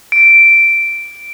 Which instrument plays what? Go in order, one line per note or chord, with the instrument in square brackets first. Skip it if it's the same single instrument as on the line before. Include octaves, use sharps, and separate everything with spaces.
[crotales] D7